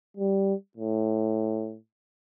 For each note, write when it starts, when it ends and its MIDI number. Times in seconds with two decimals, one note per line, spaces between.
0.17 0.54 55
0.77 1.77 45